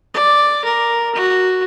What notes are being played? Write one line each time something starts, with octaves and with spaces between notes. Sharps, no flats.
D5
A#4
F#4